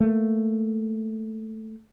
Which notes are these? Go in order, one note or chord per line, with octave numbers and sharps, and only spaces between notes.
A3 A#3